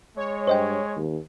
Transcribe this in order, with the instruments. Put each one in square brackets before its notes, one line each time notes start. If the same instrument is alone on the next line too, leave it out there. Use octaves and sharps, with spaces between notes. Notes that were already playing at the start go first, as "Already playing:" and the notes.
[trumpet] G#3 [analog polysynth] C#5
[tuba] G2 [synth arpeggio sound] C5 D#5 G5
[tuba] D#2